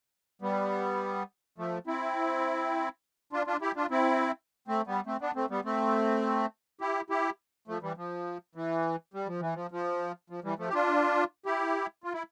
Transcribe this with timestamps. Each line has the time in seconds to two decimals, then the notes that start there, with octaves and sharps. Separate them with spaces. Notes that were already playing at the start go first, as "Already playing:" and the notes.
0.42 G3 B3
1.58 F3 A3
1.87 C4 E4
3.33 D4 F4
3.47 D4 F4
3.61 E4 G4
3.76 D4 F4
3.91 C4 E4
4.68 A3 C4
4.87 G3 B3
5.06 A3 C4
5.21 B3 D4
5.36 A3 C4
5.50 G3 B3
5.65 A3 C4
6.81 E4 G4
7.10 E4 G4
7.68 F3 A3
7.82 E3 G3
7.97 F3
8.55 E3
9.14 G3
9.27 F3
9.41 E3
9.55 F3
9.71 F3
10.30 F3
10.44 E3 G3
10.59 F3 A3
10.69 G4
10.73 D4 F4
11.46 E4 G4
12.04 F4
12.14 E4